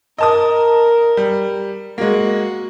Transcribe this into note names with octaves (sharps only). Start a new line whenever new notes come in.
A#4 D#5 A5 D#6
G3
G#3 A#3 F#4